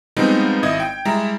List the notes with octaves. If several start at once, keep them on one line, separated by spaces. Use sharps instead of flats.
F3 G3 G#3 B3 C4 D#4
G#1 E4 D#5 D#6 G#6
G5
G3 G#3 E4 A#5